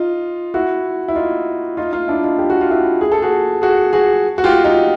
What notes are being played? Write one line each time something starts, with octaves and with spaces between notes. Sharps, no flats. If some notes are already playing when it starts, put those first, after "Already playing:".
Already playing: D#4 F4
E4 F#4
E4
D#4 F4
D#4 F4
D#4 F4
D4 E4
D#4 F4
G4
F#4
F4
E4 F#4
G#4
A4
F#4 G#4
F#4 G#4
F#4 G#4
F#4
F4 G4
D#4 F4